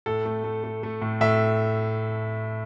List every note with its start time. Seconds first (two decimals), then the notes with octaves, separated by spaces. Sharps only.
0.06 A2 A4
0.26 A3
0.44 A3
0.64 A3
0.83 A3
1.02 A2
1.21 A2 E5